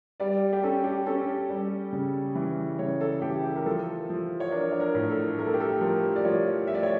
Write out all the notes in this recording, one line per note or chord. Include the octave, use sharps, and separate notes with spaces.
G3 D5
G4
C#4 A4
G4
C#4 A4
G3
C#3
E3
C#3 C#5
A4
E3 G4
G4
A#4
F3 A4
F3
C#5
D4 A#4
C#5
A#4
A2
A4
A3 A#4
A4
G4
A4
F3 A#4
D5
F3 C#5
A3 E5
D5
C#5